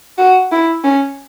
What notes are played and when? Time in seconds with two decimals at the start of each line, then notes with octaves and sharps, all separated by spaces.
0.18 F#4
0.52 E4
0.84 C#4